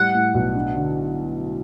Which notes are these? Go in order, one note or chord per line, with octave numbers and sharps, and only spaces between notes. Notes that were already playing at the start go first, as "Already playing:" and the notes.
Already playing: A2 G3 F#5
A2
B1
D4
D3